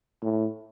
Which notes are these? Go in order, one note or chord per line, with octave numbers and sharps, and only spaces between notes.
A2